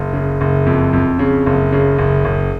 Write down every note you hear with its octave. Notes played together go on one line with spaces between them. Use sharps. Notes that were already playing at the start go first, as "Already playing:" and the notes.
Already playing: F#1
C#3
F#1
F2
F2
C#3
F#1
C#3
F#1
F#1